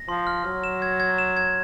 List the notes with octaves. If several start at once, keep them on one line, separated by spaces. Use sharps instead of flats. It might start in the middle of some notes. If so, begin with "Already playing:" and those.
Already playing: A#6
F3 C6
F6
F#3 F6
E7
G#6
G#6
E7
G#6